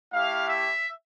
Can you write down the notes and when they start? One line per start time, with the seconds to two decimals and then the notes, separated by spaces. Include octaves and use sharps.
0.13 A3 E4 G4 F5
0.49 E5